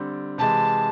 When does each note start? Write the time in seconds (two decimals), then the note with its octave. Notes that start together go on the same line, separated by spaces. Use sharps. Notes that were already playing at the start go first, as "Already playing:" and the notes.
Already playing: D3 G3 C4
0.38 C3 E3 G#3 A5